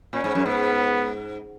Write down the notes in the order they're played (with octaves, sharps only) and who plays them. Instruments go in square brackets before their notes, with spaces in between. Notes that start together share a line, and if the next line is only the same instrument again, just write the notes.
[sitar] A#2 [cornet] C#4
[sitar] G#2
F#2
[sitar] G#2 [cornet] B3